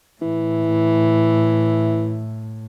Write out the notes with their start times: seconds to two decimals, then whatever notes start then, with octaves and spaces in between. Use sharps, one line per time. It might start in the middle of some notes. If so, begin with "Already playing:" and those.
0.22 A2 E3